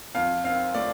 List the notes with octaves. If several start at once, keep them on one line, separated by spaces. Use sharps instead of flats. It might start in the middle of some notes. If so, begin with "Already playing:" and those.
F2 F5
C4 F5
A3 D5